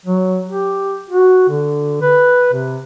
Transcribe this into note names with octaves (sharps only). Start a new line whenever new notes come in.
F#3
G4
F#4
D3
B4
C3